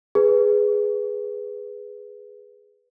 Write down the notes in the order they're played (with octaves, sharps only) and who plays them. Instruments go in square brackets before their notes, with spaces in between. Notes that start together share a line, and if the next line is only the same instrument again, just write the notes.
[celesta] G#4 B4